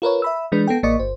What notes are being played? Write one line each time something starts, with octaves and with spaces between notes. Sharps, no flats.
F4 A#4 B4 C#5
E5 B5 E6
E3 G#3 D4 B4
B3 A4 G5
A1 A#3 D5 D#5 C#6
G1 C5